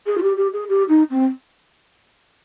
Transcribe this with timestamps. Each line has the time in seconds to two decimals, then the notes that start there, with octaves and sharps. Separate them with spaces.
0.06 G#4
0.17 F4
0.22 G4
0.37 G4
0.53 G#4
0.69 G4
0.89 D#4
1.10 C4